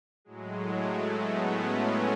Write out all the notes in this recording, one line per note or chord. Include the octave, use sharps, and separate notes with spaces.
A2 F#3 G#3
A3
G#3 B3
A3 C#4
A3